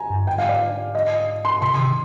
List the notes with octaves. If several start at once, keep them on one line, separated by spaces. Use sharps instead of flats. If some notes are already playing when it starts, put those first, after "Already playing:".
Already playing: G#5 A#5
G2
G#2 G5
F5
D5
D#5
C6
C3 C6
D#3